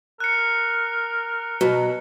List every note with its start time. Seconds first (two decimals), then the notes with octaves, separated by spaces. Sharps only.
0.20 A#4 F#6 C#7
1.61 B2 F#3